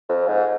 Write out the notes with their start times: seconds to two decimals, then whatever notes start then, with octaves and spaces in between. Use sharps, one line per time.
0.09 F2
0.27 G#2